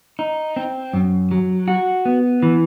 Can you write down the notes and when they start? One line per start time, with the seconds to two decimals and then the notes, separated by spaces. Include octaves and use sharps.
0.19 D#4
0.56 C4
0.93 F#2
1.31 F#3
1.68 F#4
2.05 B3
2.43 E3